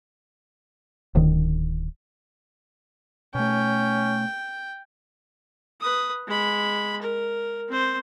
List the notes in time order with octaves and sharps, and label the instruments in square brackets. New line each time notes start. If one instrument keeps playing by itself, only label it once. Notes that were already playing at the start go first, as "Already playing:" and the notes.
[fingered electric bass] D1 D#3
[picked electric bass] B2 A3 [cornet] C#4 [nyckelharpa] G5
[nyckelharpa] B4 D#6
G#3 B5
A#4
C4 C5